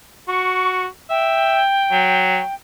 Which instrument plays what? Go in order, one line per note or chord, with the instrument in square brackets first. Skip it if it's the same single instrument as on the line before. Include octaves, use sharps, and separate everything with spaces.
[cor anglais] F#4 [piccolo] C#6
[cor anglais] E5 [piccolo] G5
[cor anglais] F#3